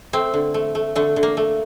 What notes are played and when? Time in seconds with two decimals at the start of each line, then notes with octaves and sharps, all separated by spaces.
0.13 A3 C4
0.34 D3
0.54 A3
0.75 A3
0.95 D3 A3
1.16 D3
1.23 A#3
1.37 A3